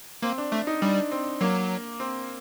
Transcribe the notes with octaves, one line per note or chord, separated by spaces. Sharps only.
A#3 C4
D4
A3 D4
D#4
G3 D4
C4
F#3 A#3
C4